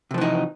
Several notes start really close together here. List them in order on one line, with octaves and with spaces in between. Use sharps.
C3 F3 E3 D#4